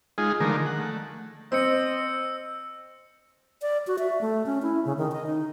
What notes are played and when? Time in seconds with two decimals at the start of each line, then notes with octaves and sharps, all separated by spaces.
0.18 G#3 D#4 F4 G#4
0.40 D3 D#3 F3 G#3 A3 A#4
0.66 F#5
0.80 A3
1.52 C4 D#5 E6 C#7
3.62 D5
3.87 F#4
3.98 E5
4.21 A3
4.46 C#4
4.62 E4
4.85 C#3
4.98 D#3
5.12 D#5
5.26 D#4